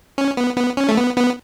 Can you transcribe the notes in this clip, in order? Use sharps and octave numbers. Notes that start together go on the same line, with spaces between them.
C#4
B3
B3
C#4
A3
B3
B3